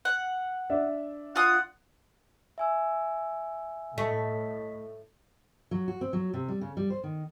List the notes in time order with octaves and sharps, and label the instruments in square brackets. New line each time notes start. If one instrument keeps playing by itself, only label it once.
[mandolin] F#5
[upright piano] D4 E5
[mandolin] F4 D#6 [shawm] F#5
[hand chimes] E5 G#5 E6
[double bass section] A2 [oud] A3 [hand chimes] D#5 B6
[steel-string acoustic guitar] F#3
F#4
C4
F#3
C3
G3
C#3
G3
C5
D#3